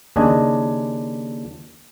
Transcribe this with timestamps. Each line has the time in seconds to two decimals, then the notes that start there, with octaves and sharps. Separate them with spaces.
0.16 D#2 C#3 D4 D#5 G#5